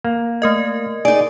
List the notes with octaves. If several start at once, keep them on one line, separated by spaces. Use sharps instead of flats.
A#3
A3 A#4 D#5
D#4 G#4 D5